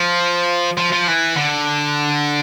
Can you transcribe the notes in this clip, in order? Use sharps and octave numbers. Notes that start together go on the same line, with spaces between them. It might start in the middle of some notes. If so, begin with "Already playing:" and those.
Already playing: F3
F3
F3
E3
D3